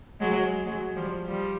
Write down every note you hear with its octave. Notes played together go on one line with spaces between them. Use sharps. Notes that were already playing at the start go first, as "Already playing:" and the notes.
F#3 G#3
F#3 G#3
F3 G3
F3 G3